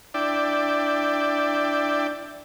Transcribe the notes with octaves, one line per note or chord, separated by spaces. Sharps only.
D4 E4 D5 G5